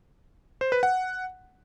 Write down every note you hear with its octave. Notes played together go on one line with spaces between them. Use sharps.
C5
B4
F#5